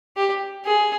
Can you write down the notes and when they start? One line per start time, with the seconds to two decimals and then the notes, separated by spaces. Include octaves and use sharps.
0.17 G4
0.65 G#4